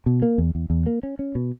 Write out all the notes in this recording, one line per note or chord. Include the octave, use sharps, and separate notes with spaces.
B2
A#3
E2
E2
E2
A#3
C#4
C#4
B2